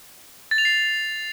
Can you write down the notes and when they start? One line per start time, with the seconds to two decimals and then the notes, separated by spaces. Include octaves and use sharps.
0.51 A6
0.58 F7
0.65 C7